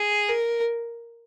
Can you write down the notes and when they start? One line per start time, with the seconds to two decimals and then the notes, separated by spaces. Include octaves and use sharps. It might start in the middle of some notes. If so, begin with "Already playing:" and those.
Already playing: G#4
0.29 A#4